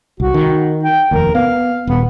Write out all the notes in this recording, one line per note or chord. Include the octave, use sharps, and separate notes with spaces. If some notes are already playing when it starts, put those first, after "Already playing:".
C2 F#4
D#3
G5
F1 D#2 A#4
B3 F5
D#1 B3